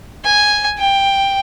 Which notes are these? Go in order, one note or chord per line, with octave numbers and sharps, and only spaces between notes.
G#5
G5